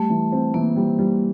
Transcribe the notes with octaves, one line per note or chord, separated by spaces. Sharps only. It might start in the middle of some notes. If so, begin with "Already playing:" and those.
Already playing: G3 A3
E3
C4
E3 A#3
G3
G3